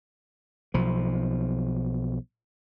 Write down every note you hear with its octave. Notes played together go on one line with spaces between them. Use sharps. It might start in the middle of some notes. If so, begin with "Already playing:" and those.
B1 F3